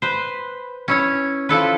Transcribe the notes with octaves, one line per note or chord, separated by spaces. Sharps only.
B4 C5
C#4 E4 C#5
F3 E4 A4 B4